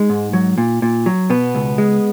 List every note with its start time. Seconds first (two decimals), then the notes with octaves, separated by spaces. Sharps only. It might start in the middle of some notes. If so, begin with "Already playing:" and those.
Already playing: G#3 D#4
0.10 G#2
0.33 F#3
0.58 A#2
0.82 A#2
1.06 F#3
1.30 B2 B3
1.55 C#2
1.78 G#3